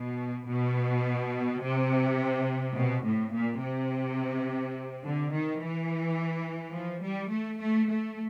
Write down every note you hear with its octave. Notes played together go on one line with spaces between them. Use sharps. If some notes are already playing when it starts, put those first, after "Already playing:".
Already playing: B2
B2
C3
B2
A2
A#2
C3
D3
D#3
E3
F3
G3
A3
A3
A3